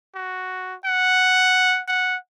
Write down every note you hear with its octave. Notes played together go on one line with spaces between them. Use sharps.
F#4
F#5
F#5